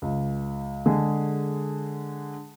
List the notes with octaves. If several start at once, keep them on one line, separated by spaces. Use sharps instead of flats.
C#2
D3 G#3 G#4